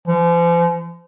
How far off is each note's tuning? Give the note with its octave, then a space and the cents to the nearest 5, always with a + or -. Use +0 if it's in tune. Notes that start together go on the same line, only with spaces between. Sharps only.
F3 -40